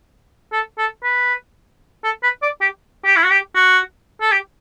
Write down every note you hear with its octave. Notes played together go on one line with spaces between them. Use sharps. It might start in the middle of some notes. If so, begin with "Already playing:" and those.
A4
A4
B4
A4
B4
D5
G4
G4
E4
F#4
G4
F#4
A4
G4